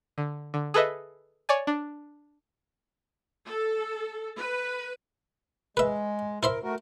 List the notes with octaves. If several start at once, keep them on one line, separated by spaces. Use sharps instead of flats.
D3
D3
G#4 A4 B4 D#5 E5
C#5 D5 G#5
D4
A4
B4
G#3 B4 E5
E4 A#4 C5 E5
A3 F#4 A#4